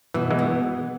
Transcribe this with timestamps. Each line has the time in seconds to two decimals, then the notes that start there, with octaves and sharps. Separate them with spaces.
0.14 B2 E3
0.30 E3 G#3
0.39 B3